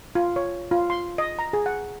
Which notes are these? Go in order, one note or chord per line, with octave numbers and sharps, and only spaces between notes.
F4
C#5
F4
C6
D#5
A#5
G#4
F#5